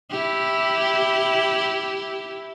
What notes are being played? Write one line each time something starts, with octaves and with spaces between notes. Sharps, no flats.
E4 G4